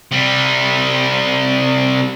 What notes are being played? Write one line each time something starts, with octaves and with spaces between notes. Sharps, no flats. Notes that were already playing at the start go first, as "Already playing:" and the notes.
C3 G3